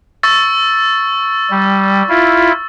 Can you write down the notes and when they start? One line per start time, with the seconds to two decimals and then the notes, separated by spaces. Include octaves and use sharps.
0.23 C#6 E6 A6
1.51 G3
2.09 E4 F4